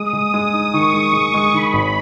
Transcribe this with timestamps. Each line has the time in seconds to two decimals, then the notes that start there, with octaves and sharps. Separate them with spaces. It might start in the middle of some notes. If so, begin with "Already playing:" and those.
Already playing: G#3 D#6
0.13 G#3
0.33 G#3 D#6
0.53 D#4
0.73 D#3 C#6
0.94 G#3
1.13 G#3
1.34 G#3
1.53 D#3 B5
1.73 G#1